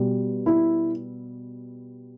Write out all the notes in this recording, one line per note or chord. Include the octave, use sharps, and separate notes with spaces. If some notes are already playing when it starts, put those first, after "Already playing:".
Already playing: B2 G3
E4